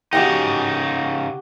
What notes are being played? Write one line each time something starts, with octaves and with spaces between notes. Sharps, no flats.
C#3 D#4 F#4 G4 G5